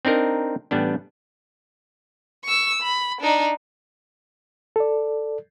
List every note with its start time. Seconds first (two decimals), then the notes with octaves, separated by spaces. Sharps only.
0.05 C4 D4 D#4 A#4
0.71 A1 G3 B3 D4
2.45 C#6 E6
2.82 B5
3.21 D4 D#4
4.76 A4 D5